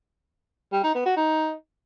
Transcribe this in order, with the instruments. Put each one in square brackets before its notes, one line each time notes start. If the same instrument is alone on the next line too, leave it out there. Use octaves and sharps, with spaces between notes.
[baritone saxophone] G3
D#4
B3
F#4
D#4